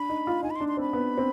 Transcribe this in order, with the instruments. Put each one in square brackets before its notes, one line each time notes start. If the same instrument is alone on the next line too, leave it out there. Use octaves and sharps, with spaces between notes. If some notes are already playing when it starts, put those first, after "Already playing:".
Already playing: [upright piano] D4 [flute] B5
[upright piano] D#4
F4
[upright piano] D#4 [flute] G#5
[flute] B5
C6
[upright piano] D4
[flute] C6
[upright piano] C4 [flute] B5
[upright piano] B3
C4